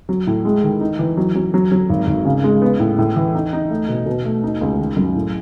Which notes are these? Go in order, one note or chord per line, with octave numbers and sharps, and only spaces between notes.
F#3
A2
G#3
D#3
D#4
E3
F#3
F#3
F#3
F#3
G#1
G#1
C#3
G#3
B3
A2
A2
E3
D#4
D#4
A3
B2
B2
A3
D#4
C#2
D#3
F#2
A2